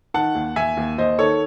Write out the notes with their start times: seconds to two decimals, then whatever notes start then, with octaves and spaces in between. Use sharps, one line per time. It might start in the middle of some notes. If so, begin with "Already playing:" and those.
0.14 D#3 F#5 A5
0.35 D#2
0.56 D#2 E5 G#5
0.77 D#2
0.98 D#2 C5 D#5
1.19 D#3 A4 C#5